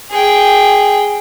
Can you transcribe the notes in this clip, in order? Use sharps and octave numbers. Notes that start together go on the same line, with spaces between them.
G#4 G5